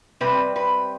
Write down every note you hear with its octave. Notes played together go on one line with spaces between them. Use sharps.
C3 G3 C4 B4
B4